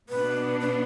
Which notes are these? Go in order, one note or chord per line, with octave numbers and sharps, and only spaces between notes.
B2 B3 D4 B4
B4